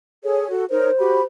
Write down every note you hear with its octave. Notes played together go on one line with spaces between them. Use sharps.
G#4 A4 C#5
F#4 A4
D#4 A#4 C5 C#5
F#4 G4 B5